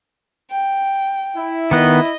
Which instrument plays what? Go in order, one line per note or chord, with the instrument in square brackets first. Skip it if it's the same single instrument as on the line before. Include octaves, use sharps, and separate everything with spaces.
[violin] G5
[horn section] E4
[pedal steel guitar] D#3 B3 [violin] D#5